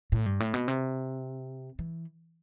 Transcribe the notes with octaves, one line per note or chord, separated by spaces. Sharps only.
A2
G2
A2
B2
C3
E3